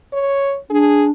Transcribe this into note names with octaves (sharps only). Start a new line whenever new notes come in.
C#5
D4 G#4